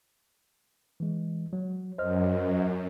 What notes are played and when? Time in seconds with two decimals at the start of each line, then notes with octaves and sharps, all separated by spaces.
1.00 E3 G#3
1.53 F#3
1.98 F#2 C5 D#5 F6